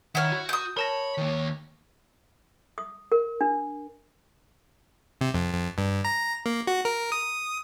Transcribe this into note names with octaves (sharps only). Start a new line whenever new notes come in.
D#3 E4 C#5 F#5 F6
F#4
D#6 G6
A#4 C#5 A5 B5 A#6
D#3 A#3
D#6
A#4
D4
C3
F2
F2
G2
A#5
A#3
F#4
A#4
D#6